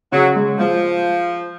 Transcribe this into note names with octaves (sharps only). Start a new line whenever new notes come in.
C#3 F#3
G#3
F3 G#3